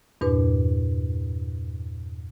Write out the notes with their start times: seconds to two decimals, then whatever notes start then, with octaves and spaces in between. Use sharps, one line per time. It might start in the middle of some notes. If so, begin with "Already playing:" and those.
0.21 E2 G2 A#2 D4 B4